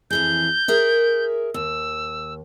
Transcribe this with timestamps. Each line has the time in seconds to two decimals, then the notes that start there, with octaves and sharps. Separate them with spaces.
0.11 F2 E3 G#4 G6
0.68 G#4 A#4 E5
1.54 D#2 E6